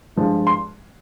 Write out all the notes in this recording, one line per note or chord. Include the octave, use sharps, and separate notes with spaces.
G2 F3 G#3
C6